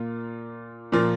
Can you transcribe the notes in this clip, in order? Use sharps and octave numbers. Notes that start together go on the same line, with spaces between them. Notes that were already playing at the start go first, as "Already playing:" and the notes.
Already playing: A#2 A#3 F4
A#2 F3 A#3 F4